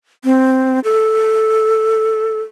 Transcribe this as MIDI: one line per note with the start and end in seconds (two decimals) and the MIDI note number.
0.25 0.80 60
0.84 2.40 69